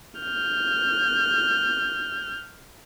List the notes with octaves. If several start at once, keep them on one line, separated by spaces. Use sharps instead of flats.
F6 G6